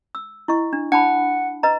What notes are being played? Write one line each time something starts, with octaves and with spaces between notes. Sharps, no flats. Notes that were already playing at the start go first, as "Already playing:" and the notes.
E6
E4 D#5 C#6
D4
D4 F#5 A5 B5
B4 D#5 A#5